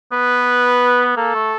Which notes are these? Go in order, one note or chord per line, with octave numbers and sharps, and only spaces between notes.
B3 B4
A#3 A4
A3